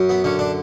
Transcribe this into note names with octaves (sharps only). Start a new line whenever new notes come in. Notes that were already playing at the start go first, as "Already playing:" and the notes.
Already playing: F#2
B3
D3 C#4
D4